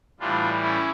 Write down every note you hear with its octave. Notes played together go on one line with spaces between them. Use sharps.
A2 E3 G3 D4 F4
C#4 E4